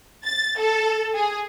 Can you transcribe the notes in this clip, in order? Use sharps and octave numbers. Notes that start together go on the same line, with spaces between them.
A6
A4
G#4